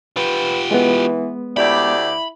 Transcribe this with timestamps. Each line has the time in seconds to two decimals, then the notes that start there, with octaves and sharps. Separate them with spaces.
0.17 F4 G4 B4
0.71 E3 G#3 B3
1.57 D2 E4 G4 D5 B5